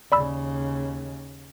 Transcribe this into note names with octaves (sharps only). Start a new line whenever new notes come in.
D#2 C#3 D5 B5 E6